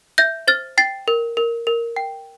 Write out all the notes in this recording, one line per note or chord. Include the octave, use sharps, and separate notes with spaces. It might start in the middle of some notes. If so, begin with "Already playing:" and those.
E5 G6 A#6
C5 F6 A6
G5 A6 C7
A#4
A#4
A#4
G5